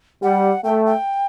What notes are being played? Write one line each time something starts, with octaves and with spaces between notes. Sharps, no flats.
G3 F#5
A3 G5
G5